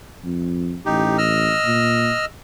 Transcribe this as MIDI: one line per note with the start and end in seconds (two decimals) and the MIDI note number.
0.24 0.78 41
0.85 1.55 33
0.85 1.17 63
0.85 1.17 67
1.18 2.25 75
1.18 2.25 88
1.18 2.25 89
1.65 2.11 46